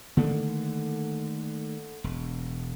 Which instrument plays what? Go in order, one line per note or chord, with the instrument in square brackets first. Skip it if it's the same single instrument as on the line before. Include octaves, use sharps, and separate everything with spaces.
[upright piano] D3 [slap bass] D#3 A3 A#3
[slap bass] E1